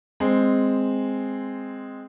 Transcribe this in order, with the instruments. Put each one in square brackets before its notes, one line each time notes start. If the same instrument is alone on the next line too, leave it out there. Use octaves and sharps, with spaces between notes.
[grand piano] G#3 C4